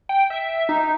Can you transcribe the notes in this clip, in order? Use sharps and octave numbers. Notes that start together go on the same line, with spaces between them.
G5
E5
D#4